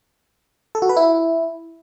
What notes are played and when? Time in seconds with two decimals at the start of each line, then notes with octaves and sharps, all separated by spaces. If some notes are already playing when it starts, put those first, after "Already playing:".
0.75 A4
0.82 F#4
0.89 B4
0.97 E4